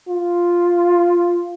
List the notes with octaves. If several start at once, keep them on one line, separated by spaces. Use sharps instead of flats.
F4